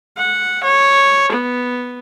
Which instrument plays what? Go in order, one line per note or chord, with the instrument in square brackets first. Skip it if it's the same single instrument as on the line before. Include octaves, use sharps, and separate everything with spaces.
[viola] F#5
C#5
B3